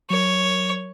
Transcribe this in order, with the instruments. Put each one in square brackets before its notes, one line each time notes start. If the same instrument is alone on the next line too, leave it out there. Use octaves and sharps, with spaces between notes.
[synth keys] F#3 A#4 [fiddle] C#5